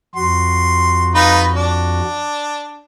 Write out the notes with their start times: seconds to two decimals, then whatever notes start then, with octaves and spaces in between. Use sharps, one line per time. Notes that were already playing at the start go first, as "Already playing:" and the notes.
0.16 F2 F#4 C6
1.15 D#4 F4 B4
1.55 D4